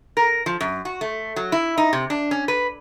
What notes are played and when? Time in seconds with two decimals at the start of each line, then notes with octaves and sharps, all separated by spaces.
0.17 A#4
0.46 F3
0.61 F#2
0.85 F#4
1.01 A3
1.36 F#3
1.52 E4
1.78 D#4
1.93 C3
2.10 D4
2.31 C#4
2.48 B4